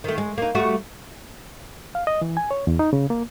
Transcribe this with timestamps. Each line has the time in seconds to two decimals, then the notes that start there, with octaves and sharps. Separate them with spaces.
0.04 D#3 A3
0.18 G#3
0.38 A#3 D#4
0.55 G3 A3 F#4
1.95 F5
2.07 D#5
2.22 E3
2.37 G#5
2.51 C#5
2.67 E2
2.79 D#4
2.93 C#3
3.10 A#3